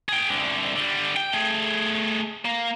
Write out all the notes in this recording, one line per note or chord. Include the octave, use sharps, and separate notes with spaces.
G#4 G5
C2 D3
D3 G3
G5
A3 G#4
A#3